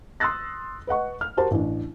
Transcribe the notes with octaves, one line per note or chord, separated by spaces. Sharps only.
C6 D#6 E6 F#6 A6 A#6
B4 D#5 F#5 C#6
F6
F#4 G4 A#4 C5 A5
A1 D4